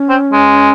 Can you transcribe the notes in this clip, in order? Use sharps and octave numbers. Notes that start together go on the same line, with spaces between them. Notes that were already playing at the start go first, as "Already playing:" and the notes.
Already playing: C#4
C4
G#3